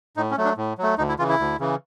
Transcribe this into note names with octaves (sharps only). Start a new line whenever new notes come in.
A2 D#4
C#4
F#3 A3
D4
A2
F#3 A3
D2 D#4
E4
C#3 E3 F4
E4
D2
C#3 E3